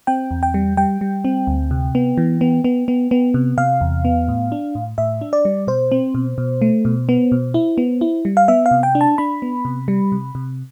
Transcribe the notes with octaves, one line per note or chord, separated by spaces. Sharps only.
C4 G5
E2
G5
G3
G3 G5
G3
C4
D2
C3
B3
E3
B3
B3
B3
B3
C3
C3 F5
E2
B3
A2
D4
A2
A2 E5
D4
D5
G3
B2 C5
C4
B2
B2
A3
B2
B3
B2
E4
B3
E4
G3
F5
B3 E5
F5
C3
G5
D4
A5
D4 B5
B3
C3
G3
C3
C3